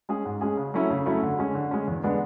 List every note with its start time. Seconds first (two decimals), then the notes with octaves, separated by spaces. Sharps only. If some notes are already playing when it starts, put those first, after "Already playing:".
0.09 G#3 C#4 G#4
0.25 G#2
0.41 G#3 C#4 G#4
0.57 C#3
0.74 F#3 A3 C#4 E4
0.90 C#3
1.06 F#3 A3 C#4 E4
1.23 D3
1.38 G#3 C#4
1.55 D3
1.71 G#3 C#4
1.88 E2
2.04 D3 G#3 B3 D4